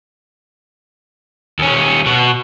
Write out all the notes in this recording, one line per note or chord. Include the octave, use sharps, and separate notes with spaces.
D#2 C#4
B2 F#4